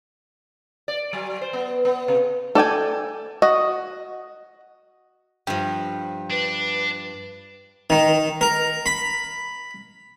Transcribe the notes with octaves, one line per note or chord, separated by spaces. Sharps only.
D5
F#3
C5
B3
B3
C3
A4 D5 G5 G#5
F#4 D#5
G2 F3 G5
D4 B4
D#3
A#4
B5